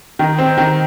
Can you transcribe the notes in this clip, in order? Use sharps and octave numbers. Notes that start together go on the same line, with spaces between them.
D#3
C4
D#3